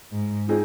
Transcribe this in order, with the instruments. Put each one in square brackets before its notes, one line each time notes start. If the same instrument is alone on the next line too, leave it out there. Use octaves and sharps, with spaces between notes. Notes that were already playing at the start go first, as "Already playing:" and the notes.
[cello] G#2
[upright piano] F3 C4 D#4 G#4